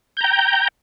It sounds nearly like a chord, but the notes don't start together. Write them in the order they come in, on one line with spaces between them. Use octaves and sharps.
G6 A#5 G5